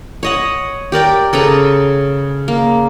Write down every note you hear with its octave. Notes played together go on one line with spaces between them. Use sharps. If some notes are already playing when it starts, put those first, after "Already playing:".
C#5 D#5 F#5
G4 A#4 D5 G5
C#3 A4 B4 A#5
A#3